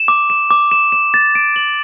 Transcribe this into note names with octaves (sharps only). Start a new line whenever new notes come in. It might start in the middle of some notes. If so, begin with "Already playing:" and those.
Already playing: E7
D6
E7
D6
E7
E7
A6
D7
F#7